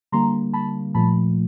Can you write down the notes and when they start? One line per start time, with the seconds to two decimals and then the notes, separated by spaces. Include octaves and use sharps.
0.12 D3 G3 A#3 A#5 C6
0.53 A5 B5
0.94 A#2 F3 A3 A5 B5